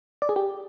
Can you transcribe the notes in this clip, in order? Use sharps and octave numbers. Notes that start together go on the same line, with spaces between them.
D5
G#4
G4